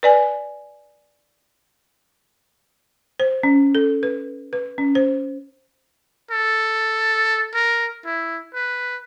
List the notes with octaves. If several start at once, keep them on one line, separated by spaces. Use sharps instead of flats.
B4 D5 G#5
C5
C#4
A4
B4
B4
C#4
C5
A4
A#4
E4
B4